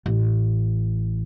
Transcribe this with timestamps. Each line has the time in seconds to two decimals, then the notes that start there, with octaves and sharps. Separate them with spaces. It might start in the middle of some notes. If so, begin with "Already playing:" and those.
0.06 A1